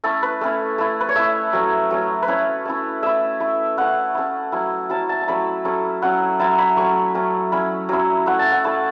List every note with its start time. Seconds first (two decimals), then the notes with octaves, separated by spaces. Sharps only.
0.04 A3 C#4 E4 A4
0.23 B4
0.41 A3 C#4 E4
0.78 A3 E4
1.00 B4
1.09 C#5
1.16 A3 E4 E5
1.53 F#3 A3 C#4
1.90 F#3 A3 C#4
2.22 B4
2.28 A3 C#4 E4 C#5
2.65 A3 C#4 E4
3.03 A3 E4 E5
3.40 A3 E4
3.77 A3 C#4 E4 F#5
4.15 A3 C#4 E4
4.52 F#3 C#4 E4
4.90 F#3 C#4 E4 A5
5.09 A5
5.22 A5
5.27 F#3 A3 C#4 E4 B5
5.65 F#3 A3 C#4 E4 A4
6.02 F#3 C#4 E4 F#5
6.39 F#3 C#4 E4 A5
6.58 B5
6.77 F#3 A3 C#4 C#6
7.14 F#3 A3 C#4
7.52 F#3 C#4 E4 B5
7.89 F#3 C#4 E4
8.26 A3 E4 F#5
8.39 A5
8.52 F#5
8.64 A3 E4 A5